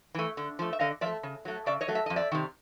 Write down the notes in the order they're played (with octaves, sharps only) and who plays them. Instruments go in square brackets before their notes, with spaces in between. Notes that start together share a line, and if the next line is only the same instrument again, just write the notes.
[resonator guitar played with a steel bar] E3 A3
D3
F3 A3
E5
D3 D#5 F5
F3 D5 E5
A3
C#3
F#3 A3
C#3 D5 E5
C#5 D#5
F#3 A3
E5
F2 D#5
D5 E5
C3 D#3